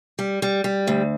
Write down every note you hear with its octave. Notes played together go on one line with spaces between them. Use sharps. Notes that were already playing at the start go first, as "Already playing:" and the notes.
G3
G3
G3
D2